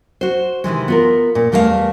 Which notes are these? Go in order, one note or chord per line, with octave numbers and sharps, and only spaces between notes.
F#4 C5
C3 D#3 E3 G#3
B3 F4 A#4
A#2
E2 G3 A3 A#4 B4 F5